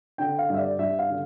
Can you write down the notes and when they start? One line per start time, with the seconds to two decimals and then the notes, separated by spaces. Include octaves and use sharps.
0.18 D3 G5
0.39 F5
0.50 G2 E5
0.59 D5
0.79 G2 E5
0.99 F5
1.10 D3